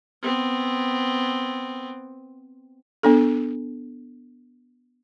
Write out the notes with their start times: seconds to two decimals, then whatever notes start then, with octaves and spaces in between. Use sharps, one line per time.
0.23 B3 C4
3.03 B3 D4 A4